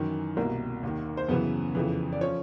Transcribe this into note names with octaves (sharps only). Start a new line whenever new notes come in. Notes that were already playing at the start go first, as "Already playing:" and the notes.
Already playing: F#2 D#3 E3 E4
C2 B2 A#3 A#4
D#2 D#3
C5
F#2 C#3 E3 B3 B4
F2 C#3 E3
D5
F3 C#4 C#5